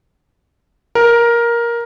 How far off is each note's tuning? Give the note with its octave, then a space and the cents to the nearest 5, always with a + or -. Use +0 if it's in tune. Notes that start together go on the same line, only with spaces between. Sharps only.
A#4 +10